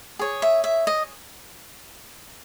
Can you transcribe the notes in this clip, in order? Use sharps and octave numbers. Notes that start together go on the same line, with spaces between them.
G#4 C#5
E5
E5
D#5